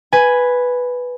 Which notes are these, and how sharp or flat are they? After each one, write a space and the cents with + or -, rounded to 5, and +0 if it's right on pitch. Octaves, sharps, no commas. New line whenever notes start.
B4 +0 G#5 +0